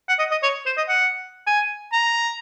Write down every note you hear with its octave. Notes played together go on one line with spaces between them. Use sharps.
F#5
D#5
D#5
C#5
C5
D#5
F#5
G#5
A#5